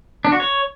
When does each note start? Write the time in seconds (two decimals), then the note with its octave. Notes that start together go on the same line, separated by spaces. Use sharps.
0.25 D4
0.32 F#4
0.40 C#5